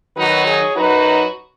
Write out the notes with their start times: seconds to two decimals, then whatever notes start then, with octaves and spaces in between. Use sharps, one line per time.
0.15 D#3 F#3 D#4 F#4 B4
0.45 G#4 C#5
0.75 F#2 F#3 D#4 F#4 B4